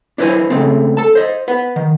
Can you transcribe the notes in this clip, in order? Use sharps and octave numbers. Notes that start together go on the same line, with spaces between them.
D4 E4 B4 C5 G#5
C#3 G#3 A3 C4
A4 A5
C5 D#5
B4 F#5
D#3